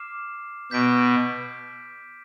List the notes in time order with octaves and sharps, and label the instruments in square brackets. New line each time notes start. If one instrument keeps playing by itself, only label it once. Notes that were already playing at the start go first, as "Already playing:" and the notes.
Already playing: [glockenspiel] D6 F6 C7 E7
[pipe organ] B2 [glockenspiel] G6 B6 D7